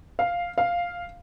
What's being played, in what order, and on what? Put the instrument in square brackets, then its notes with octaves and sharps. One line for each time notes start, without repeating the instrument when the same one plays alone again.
[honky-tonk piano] F5
F5